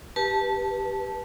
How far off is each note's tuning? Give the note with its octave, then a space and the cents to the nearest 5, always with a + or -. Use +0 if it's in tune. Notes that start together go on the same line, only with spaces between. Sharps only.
G4 +0 B4 -25 A5 -15